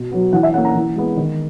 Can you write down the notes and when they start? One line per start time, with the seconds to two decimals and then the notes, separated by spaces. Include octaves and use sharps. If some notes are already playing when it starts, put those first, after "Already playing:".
Already playing: B2
0.11 F#3 B3
0.33 E3 F#5
0.43 E5
0.54 C#4 F#5
0.58 A#3
0.65 A#5
0.75 E3
0.96 G#3 B3
1.17 D#3